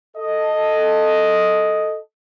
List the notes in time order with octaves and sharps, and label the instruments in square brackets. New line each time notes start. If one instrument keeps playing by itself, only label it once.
[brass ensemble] A4 D#5